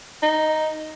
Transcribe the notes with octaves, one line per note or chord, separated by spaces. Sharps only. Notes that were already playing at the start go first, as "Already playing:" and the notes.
D#4